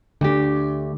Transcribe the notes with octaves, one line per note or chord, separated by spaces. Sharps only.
D2 D3 G4